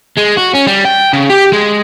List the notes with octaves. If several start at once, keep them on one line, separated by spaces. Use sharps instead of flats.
G#3
F#4
C#4
G3
G5
C#3
G4
G#3